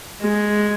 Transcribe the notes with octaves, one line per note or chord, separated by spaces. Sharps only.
G#3